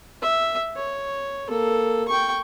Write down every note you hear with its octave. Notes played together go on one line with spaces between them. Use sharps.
E5
C#5
A#3 A4
G5 C#6